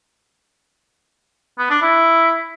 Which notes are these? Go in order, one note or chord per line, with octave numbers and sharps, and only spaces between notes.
B3
D4
E4